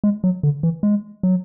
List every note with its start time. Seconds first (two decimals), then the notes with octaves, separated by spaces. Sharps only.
0.04 G#3
0.24 F#3
0.43 D3
0.63 E3
0.83 G#3
1.23 F#3